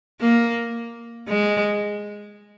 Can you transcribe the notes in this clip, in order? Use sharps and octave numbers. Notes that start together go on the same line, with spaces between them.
A#3
G#3